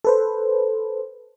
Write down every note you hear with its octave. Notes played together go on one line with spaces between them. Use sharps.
A4 B4 C5